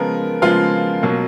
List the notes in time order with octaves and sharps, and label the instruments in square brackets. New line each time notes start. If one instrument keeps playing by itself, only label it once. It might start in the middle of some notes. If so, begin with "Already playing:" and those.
Already playing: [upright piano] C#3 F3 G#3 B3 A#4
C#3 F3 G#3 B3 F4 F5
B2 F#3 A#3